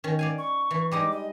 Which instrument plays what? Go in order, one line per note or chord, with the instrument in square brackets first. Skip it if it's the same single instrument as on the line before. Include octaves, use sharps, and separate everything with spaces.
[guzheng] D#3 C#4
D5 F5 G#5
[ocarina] C#6
[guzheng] E3
[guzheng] G3 G#3 D#4 [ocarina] D6
[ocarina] D#5